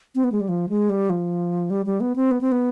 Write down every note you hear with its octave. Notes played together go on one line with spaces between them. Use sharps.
C4
B3
G#3
G3
F3
G#3
G3
F3
G3
G3
B3
C4
B3
C4
B3